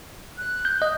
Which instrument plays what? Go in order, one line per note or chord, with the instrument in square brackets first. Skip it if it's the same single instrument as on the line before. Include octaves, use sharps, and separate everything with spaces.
[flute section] F#6
[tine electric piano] G6
D#5